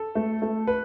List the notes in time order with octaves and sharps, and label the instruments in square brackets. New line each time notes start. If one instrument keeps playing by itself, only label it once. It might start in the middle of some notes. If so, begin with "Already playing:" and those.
Already playing: [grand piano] A4
[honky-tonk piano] A3
A3
[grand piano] B4